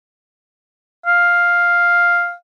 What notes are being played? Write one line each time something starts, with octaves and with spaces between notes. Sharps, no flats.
F5